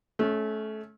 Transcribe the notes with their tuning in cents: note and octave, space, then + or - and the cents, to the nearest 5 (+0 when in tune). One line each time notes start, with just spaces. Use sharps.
A3 -25 C#4 +0